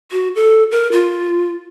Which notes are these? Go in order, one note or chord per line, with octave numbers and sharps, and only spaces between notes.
F#4
A4
A#4
F4